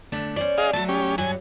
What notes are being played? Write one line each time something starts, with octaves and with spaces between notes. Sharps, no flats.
D3 A3 D4
C#4 C5 D5
G#4 D#5 F5
F#3 A3 A5
C#4 G4
G2 F#3 G#5